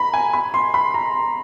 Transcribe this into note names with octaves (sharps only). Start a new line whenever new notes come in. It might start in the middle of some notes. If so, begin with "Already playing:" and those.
Already playing: A#5 B5
G#5
B5
C6
B5
A#5